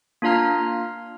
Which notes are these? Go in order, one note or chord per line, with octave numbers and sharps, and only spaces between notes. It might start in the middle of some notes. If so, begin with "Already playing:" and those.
A#3 D4 F4 F5 A#5 F6